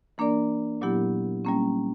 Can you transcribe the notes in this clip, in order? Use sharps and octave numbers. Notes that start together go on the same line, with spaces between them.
E3 A#3 D4 A#4 D5
A#2 F#3 B3 E4 G4
G3 A#3 C#4